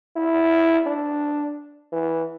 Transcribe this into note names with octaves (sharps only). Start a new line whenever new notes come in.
E4
D4
E3